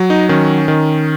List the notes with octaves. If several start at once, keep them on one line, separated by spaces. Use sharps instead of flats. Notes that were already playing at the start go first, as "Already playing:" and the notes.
Already playing: F#3
D#4
D#3 C#4
D#3